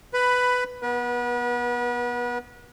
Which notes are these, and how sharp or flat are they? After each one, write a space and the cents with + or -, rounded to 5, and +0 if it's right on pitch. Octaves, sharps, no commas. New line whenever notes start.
B4 +10 B5 +0
B3 -15 B4 -35